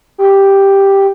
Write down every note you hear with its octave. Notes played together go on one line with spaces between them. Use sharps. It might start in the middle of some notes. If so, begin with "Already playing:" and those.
G4